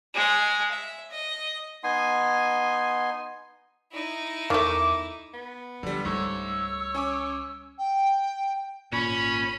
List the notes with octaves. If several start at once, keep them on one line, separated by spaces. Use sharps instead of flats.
G#3 G#5
E5
D#5
B3 D#4 G#5 C6
D#4 E4
E2 D#3 A3 D6
B3
D3 F3 G3
C#2 G#2 G3 A3 C#5 E6
C#4 G#5 D6
G5
G#1 A#2 C#4 B5